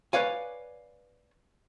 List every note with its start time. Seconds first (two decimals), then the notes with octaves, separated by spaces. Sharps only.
0.13 B4 C#5 D5 F5 G#5